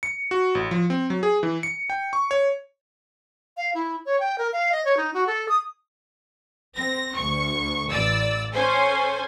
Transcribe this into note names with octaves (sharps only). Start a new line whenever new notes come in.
C#7
F#4
A1
F3
C4
F#3
G#4
E3
C#7
G5
C#6
C#5
F5
E4
C#5
G5
A#4
F5
D#5
C#5
D#4
F#4
A4
D#6
C4 A#6
D2 C#6
A1 D5 E6
C#4 A4 C5 G#5